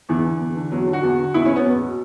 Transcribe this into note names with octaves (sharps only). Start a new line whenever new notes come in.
E2 E3
D3
E2
D3
E2 F#3
D3
F#4
E2
D3
E2 E4
B2 C#4
B3
E2
B2